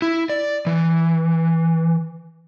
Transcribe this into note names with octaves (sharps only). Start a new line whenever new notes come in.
E4
D5
E3